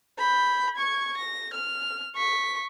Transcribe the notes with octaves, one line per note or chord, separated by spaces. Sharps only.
B5 G6
C#6 G#6
A#6
F6
C#6 B6